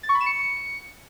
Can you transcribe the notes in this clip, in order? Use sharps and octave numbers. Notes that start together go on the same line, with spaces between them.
A6
C#6
B5
E7
C#7